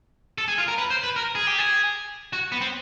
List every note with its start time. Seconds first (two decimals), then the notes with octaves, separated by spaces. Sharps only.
0.38 A4
0.48 G#4
0.58 F4
0.68 A#4
0.78 B4
0.90 C5
1.03 B4
1.16 A#4
1.35 G#4
1.47 G4
1.59 G#4
2.33 F#4
2.52 B3
2.61 C4